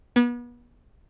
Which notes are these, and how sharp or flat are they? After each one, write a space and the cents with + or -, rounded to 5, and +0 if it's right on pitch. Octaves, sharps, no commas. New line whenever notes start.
B3 -35